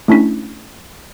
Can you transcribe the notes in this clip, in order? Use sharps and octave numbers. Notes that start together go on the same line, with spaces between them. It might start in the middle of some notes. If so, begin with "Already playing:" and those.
A3 C#4 D4 E4 C#6 B6